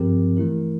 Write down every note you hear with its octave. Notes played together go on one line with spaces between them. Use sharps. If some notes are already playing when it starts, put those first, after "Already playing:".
Already playing: G2 F3 C4 G4 A#4
E3 A3 E4 A#4